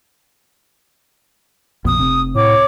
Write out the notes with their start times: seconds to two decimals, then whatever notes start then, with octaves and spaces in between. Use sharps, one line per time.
1.85 A#1 F2 B2 D#6
1.99 F1 C3
2.35 A2 C#5 D6